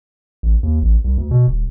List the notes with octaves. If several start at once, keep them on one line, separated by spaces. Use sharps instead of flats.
A1
D#2
A1
C2
D2
B2
D#1